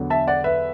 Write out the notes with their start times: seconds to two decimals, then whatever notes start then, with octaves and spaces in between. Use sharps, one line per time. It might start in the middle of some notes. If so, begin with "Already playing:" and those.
Already playing: E2 D3 F#3
0.10 E5 A5
0.28 D5 F#5
0.44 B4 E5